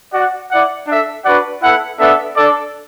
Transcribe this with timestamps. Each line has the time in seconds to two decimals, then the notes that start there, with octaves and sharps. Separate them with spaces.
0.12 F#4 D5 F#5
0.50 E4 D5 F#5
0.87 D4 A4 E5
1.24 D4 F#4 B4 D5 F#5
1.62 B3 E4 A4 F#5
1.99 B3 D4 A4 E5
2.37 D4 A4 D5